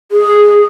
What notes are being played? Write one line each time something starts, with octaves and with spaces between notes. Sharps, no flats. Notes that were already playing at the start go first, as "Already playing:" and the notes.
G#4